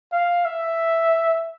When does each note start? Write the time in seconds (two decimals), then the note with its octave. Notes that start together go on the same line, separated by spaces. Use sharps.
0.12 F5
0.45 E5